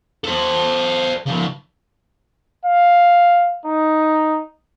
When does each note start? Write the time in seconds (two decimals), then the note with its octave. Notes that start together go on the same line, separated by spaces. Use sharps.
0.24 A4 C5
1.27 C#3 F3
2.66 F5
3.66 D#4